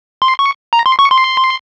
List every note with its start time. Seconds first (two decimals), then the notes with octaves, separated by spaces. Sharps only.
0.22 C6
0.39 C#6
0.73 A#5
0.86 C6
0.99 C#6
1.11 C6